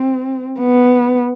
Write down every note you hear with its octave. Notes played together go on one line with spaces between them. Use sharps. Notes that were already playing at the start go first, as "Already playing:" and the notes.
Already playing: C4
B3